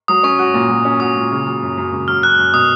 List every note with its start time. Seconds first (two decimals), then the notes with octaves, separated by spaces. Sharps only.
0.08 F#3 D#6
0.23 C#4 C#6
0.39 F#4
0.54 A#2
0.70 F#3
0.85 C#4
1.00 F#4 D#6
1.16 A#2
1.31 C#3
1.46 F#3
1.62 F#2
1.77 F#2
1.92 C#3
2.08 F#3 F6
2.23 F#2 F#6
2.38 F#2
2.53 B2 D#6